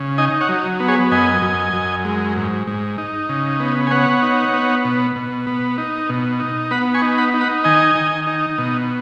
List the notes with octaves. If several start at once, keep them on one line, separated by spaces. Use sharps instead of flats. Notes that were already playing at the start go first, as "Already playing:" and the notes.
Already playing: C#3
D#4 D#5 G#5
C#5 F#5
F#3
B3
G#4 C#5
F#2 D#5 G#5
F#2
F#2
G#3
G#2
G#2
D#4
C#3
B3
G#5
B3 C#5 F#5
D#4
B3
B2
B2
B3
D#4
B2
D#4
B3 F#5 B5
G#5 C#6
D#4
F#5 B5
D#4
F#5 B5
D#3 D#5 G#5
D#3
D#4
B2